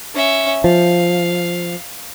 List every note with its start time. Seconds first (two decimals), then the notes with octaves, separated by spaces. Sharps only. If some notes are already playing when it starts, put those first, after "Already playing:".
0.15 C#4 E5
0.64 F3 F5